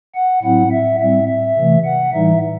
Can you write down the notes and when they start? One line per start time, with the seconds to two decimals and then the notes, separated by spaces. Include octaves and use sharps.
0.15 F#5
0.43 A2 F#3 C4 E4 F#5
0.72 E5
1.00 A2 G3 C4 E5
1.28 E5
1.57 C3 E3 A3
1.85 F#5
2.13 A2 E3 G3 D#4 E5